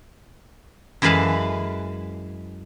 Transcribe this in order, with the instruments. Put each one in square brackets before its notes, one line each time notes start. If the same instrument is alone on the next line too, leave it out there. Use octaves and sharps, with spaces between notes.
[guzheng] F#2 E3 G#3 B4 F5 A5